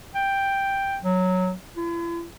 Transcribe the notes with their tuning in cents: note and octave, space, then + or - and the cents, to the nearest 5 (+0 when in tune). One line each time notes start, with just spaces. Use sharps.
G5 +5
F#3 -5
E4 +45